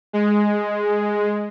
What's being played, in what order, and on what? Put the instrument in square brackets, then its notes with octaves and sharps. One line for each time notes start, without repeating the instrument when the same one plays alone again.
[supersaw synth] G#3